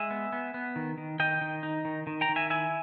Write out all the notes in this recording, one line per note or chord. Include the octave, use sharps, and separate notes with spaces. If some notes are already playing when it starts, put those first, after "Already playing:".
Already playing: G#3 E5 G#5
B3
B3
B3
D#3
D#3
D#3 D#5 G5
D#3
D#4
D#3
D#3
G5 A#5
D#3
E5 G#5
E4 E5 G#5